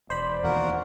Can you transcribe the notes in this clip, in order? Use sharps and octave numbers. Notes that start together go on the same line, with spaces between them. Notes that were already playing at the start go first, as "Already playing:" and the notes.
E1 C5 D5 B5
E2 B2 D#3 A#3 F#4 A#4